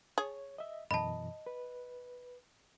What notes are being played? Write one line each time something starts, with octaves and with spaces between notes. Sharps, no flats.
G#4 C#5
D#5 E5
F#2 B2 E3 D#5 A5 B5
B4